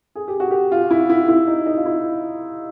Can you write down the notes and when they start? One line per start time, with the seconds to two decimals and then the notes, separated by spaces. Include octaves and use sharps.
0.15 G#4
0.28 G4
0.40 F#4
0.51 G4
0.72 F4
0.91 E4
1.09 E4
1.28 E4
1.47 D#4
1.66 D#4
1.77 F4
1.86 E4